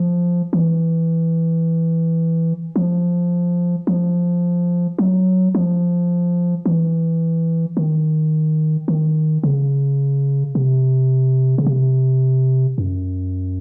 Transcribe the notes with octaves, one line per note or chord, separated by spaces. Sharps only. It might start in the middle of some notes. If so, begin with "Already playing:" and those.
Already playing: F3
E3
F3
F3
F#3
F3
E3
D#3
D#3
C#3
C3
C#3
C3
F#2